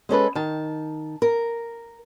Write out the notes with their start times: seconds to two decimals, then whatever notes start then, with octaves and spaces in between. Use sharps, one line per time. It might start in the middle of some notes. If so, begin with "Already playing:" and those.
0.09 G#3 C#4 A4 B4
0.35 D#3 A5
1.22 A#4